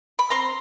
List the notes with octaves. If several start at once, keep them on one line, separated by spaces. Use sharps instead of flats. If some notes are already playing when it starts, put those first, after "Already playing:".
B5
C4 A#5 C6